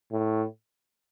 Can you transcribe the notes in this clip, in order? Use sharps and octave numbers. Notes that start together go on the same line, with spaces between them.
A2